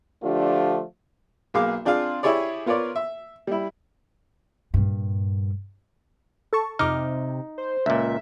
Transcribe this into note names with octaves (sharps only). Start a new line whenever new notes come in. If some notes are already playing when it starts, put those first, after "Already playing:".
D3 F3 A3 D4 F4 G4
B1 A#3 G#4 F5 D6
C4 D4 F4 G#4 F5
E4 G4 G#4 C#5 D5
B3 F4 A#4 C#5 D5
E5
G3 E4
G2 A#2
A4 A5 C#6
F2 C3 D#4 D6 F6
C5
C#2 A#2 E5